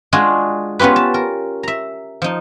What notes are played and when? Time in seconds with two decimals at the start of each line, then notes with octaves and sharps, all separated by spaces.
0.13 G#3 D4 F4 F#4 G#4
0.79 B3 C#4 F4 G4 B4
0.96 A5
1.14 A#4
1.63 E5 A#5
2.22 F3 D#4